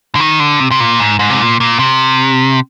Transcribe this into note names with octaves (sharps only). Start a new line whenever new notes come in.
D3
D#3
D3
C3
C3
A#2
G#2
G#2
C3
A#2
A#2
C3